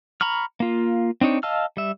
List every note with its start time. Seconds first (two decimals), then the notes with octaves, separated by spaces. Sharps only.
0.21 A#5 B5 C#6 F6
0.60 A#3 F4
1.21 C4 D4 D#4 C#5
1.43 D#5 F5 A5 E6 F6
1.77 G3 E5